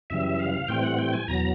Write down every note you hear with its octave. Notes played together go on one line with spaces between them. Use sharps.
F#2 C#3 E3 G3 E5
F5
A2 E3 G3 C4 G5
F#5
G5
G#5
E2 B2 F#3 A#5